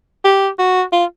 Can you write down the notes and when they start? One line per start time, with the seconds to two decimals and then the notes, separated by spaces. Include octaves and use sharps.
0.24 G4
0.59 F#4
0.92 F4